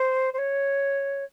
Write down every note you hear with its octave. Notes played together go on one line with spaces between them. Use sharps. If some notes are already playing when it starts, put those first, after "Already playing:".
Already playing: C5
C5
C#5